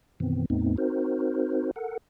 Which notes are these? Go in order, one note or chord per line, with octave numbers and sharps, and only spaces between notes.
F#2 B2 D#3 E3 B3 C4
E2 A2 A3 B3 C4 D#4
C4 D#4 F#4 A#4 C5
A4 A#4 F#5